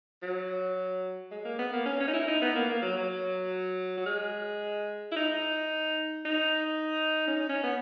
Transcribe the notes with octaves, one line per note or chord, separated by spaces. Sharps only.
F#3
G#3
A#3
B3
A#3
C#4
C#4
D#4
E4
D#4
B3
A#3
A#3
F#3
F#3
F#3
G#3
E4
D#4
D#4
C#4
D#4
C#4
B3